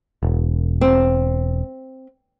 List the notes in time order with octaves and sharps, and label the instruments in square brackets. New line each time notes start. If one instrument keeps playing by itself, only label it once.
[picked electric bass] E1
[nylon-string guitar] C4